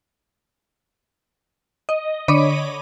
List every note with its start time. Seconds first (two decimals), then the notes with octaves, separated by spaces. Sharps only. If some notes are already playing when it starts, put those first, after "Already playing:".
1.89 D#5
2.28 D3 C#5 D#5 B5 D6 D#7